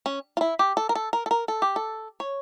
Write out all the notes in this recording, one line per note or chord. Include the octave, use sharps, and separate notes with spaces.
C#4
F4
E4
G4
A4
A#4
A4
A#4
A4
A#4
A4
G4
A4
C#5